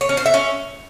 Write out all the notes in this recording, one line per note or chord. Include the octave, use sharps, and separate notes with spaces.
C#5
C#4
C5
E5
C#4